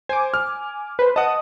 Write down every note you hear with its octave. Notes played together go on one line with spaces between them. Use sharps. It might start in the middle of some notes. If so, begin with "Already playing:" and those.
C5 G#5 D6
F6
B4 C5
D#5 F#5 A5 D#6